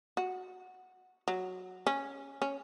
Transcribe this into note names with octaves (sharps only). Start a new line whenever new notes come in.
F#4
F#3
C#4
C#4